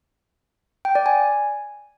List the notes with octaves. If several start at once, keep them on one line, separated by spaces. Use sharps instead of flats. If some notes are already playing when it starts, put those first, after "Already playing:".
G5
D5
G#5